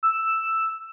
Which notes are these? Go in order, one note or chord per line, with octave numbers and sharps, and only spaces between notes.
E6